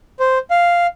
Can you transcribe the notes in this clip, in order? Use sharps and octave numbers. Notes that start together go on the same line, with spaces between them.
C5
F5